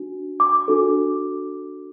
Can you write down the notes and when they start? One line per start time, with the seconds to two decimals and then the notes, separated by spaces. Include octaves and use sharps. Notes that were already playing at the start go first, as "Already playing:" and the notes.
Already playing: D4 F#4
0.40 D6
0.68 D4 F#4 A4